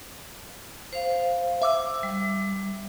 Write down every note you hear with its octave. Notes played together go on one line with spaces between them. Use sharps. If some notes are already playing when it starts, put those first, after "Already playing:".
C5 F5
E5 D6 E6
G3